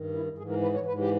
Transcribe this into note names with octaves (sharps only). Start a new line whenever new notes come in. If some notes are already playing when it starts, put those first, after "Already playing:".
Already playing: G2 D#3
E4
G#2 E3 G#4
A#4
B4
C#5
G#2 E3 B4
G4